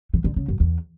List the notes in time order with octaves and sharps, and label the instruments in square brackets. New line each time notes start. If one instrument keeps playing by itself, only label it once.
[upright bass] E3
D3
C#3
F#2
E2